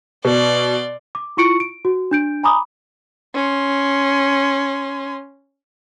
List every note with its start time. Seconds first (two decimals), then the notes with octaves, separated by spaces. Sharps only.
0.25 B2 D5 C6
1.15 D6
1.37 E4 F4 C#6 C#7 D7
1.60 D7
1.85 F#4
2.11 D4 G6 D7
2.43 G#5 A#5 B5 D6 D#6
3.35 C#4 C6